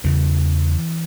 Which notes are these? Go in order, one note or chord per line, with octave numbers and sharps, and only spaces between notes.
E2 C#3 E3